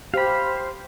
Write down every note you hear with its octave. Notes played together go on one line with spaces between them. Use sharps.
G4 C5 F5 B5